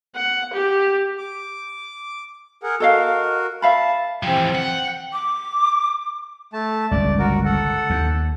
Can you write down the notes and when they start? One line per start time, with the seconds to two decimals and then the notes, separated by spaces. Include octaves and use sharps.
0.15 F#5
0.53 G4
1.18 D6
2.63 G#4 A#4 F#5
2.80 F#4 A4 A#4 D#5 F5
3.62 E5 F5 A5 B5
4.23 E3 F3 C4 G4
4.55 F#5 G5
5.13 D6
6.53 A3 A5
6.91 G1 C#2 D5
7.19 F#4 A#4
7.45 A4 F#5
7.90 D#2